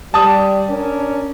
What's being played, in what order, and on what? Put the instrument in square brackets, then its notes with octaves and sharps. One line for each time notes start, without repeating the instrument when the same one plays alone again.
[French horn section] G3 [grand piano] A5 D#6
[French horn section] C#4 D4 A#4